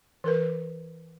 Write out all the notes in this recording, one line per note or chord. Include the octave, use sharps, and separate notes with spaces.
E3 A#4 B4